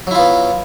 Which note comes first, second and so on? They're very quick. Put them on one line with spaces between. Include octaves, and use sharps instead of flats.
F#3 E4 F4 B3